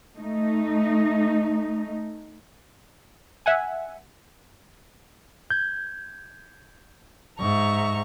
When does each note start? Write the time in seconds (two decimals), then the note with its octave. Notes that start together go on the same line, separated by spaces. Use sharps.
0.17 A3 D#4
3.46 E5 F#5 G#5
5.50 G6 G#6
7.39 G#2 E5 A#5 C#6